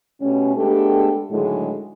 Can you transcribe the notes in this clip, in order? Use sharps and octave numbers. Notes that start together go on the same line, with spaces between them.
B2 G3 A3 C#4
G#3 A3 B3 D4 G4 A4
A2 D3 D#3 F#3 G#3